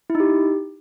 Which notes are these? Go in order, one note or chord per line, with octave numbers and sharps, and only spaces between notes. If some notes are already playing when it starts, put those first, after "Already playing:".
E4
D#4
G4